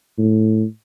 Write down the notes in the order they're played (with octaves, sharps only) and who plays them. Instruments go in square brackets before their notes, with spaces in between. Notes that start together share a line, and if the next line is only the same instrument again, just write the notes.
[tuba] A2